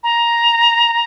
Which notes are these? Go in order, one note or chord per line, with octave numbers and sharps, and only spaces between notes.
A#5